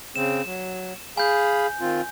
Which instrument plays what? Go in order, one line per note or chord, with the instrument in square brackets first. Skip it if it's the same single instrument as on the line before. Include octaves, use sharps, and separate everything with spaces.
[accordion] C#3 C4 [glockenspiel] E7
[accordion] F#3
[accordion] G#4 F5 B5 [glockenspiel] G#5 G6
[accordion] D#3 C4 F4